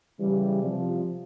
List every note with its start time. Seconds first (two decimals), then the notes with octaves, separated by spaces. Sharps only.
0.19 C#3 E3 G3
0.62 C3 F3